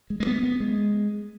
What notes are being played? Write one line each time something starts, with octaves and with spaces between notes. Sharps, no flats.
G#3
G#3
B3
B3
G#3